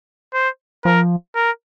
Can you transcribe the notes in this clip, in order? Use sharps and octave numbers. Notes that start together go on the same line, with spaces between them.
C5
F3 A#4
A#4